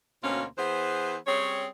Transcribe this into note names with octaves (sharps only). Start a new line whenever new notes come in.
D2 B2 A#3 C4 C#4 F5
E3 B3 G#4 C5
G3 C4 C#4 G#4 C#5